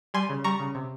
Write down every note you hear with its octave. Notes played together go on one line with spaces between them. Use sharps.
G3 G#5 C6
C#3
G3 A#5 C#6
C#3
C3